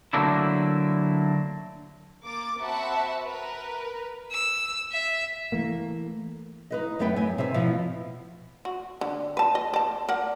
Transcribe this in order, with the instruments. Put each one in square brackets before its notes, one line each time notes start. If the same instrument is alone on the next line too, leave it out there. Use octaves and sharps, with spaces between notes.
[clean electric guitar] D3 F#3 A3 A#3 D4 E4
[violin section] A#3 D6 A6
C4 F#4 E5 F#5 A5 B5
A#4 B4
[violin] E6
E5
[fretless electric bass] E3 A3 A#3
[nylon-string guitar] D#4 B4 D#5
F#2 A3 B3 B4 G5
F#2 G#5
C3 E5 G#5
B2 F3 E4
[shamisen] F#4
D3
B4 A5
D#5
D5 A5
A#4 D5 F#5